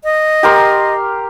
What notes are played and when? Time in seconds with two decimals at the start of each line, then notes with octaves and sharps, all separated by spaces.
0.04 D#5
0.43 G4 A#4 C6